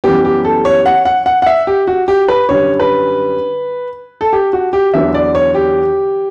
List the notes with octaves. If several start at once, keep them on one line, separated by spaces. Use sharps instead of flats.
F#2 E3 G3 B3 G4
G4
A4
C#5
F#5
F#5
F#5
F#5
E5
G4
F#4
G4
B4
F#2 D3 G3 C#5
B4
A4
G4
F#4
G4
E2 D3 F#3 B3 E5
D5
C#5
G4